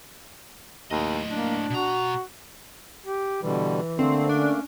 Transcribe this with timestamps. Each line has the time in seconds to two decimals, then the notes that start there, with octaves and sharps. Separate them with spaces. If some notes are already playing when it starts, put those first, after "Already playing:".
0.91 D#2 A2 D#5
1.31 A#3 D4
1.70 B2 F#4 A#5
3.06 G4
3.42 B2 D3 E3 G3
3.99 D3 A3 A#3 C4
4.29 C#4 D4